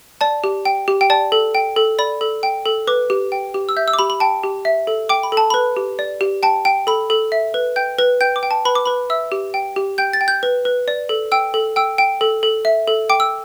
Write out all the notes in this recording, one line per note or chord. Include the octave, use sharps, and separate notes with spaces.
D5 A5
G4
G5
G4
G5
D5 A5
A4
G5
A4
D5 B5
A4
G5
A4
B4 D6
G4
G5
G4
E6
E5 G6
E6
D6
G4 B5
B5
G5 A5
G4
E5
A4
G5 D6
B5
A4
A5
B4 B5
G4
D5
G4
G5 A5
G5
A4 B5
A4
E5
B4
G5 G6
B4
G5 G6
D6
G5
A5
B4 B5
D6
B4 B5
E5 E6
G4
G5
G4
G5 G6
A6
G5
G6
B4
B4
D5
A4
G5 E6
A4
G5 E6
G5
A4
A4
E5
A4
G5 D6
E6